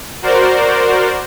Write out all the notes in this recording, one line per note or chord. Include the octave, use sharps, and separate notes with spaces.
F#4 A#4 C5 D5